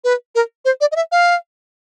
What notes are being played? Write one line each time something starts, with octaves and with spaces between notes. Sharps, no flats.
B4
A#4
C5
D5
D#5
E5
F5